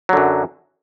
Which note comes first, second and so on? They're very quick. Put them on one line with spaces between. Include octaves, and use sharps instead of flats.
F#3 D3 F#2